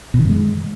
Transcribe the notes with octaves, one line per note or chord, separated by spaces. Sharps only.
B2
D#3
F#2
G#3